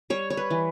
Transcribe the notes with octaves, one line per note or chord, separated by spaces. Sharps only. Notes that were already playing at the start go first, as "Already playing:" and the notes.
G3 C#5
C#5
B4
E3